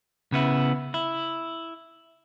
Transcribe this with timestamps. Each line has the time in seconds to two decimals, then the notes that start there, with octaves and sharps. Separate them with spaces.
0.32 C#3 B3 E4
0.94 E4